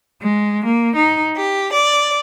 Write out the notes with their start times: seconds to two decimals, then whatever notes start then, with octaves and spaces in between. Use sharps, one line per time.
0.23 G#3
0.65 A#3
0.96 D#4
1.36 G4
1.73 D5